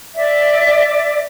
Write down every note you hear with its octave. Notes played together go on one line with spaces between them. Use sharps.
D5 E5